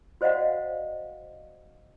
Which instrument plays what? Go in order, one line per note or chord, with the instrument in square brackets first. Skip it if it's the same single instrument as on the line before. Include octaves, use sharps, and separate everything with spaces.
[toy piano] F#4 C5 D5 D#5 F5 F#5